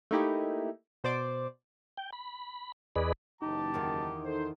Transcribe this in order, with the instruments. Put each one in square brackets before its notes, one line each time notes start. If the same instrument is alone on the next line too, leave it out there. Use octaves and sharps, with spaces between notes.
[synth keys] A3 A#3 D#4 E4 G4
B2 C5 D5 D6
[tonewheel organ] G5
B5
E2 G#4 B4 D5 D#5 B5
[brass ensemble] F#1 E3 A5 [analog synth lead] D#4 [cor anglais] G4
[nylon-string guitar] E2 D#3
[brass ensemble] A4 C5